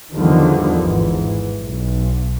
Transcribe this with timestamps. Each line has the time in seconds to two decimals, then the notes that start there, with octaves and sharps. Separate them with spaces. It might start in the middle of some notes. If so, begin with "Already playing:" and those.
0.13 E2 D3 D#3 F3 G3
0.80 G#1 G#2 E3
1.60 B1